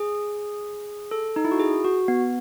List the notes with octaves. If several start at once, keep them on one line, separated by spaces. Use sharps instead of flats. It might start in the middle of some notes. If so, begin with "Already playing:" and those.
Already playing: G#4
A4
D#4
E4
F#4
G#4
F#4
B3